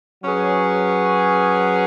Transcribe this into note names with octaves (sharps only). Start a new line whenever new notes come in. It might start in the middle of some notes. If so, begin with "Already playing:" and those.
F#3 C#4 G#4 B4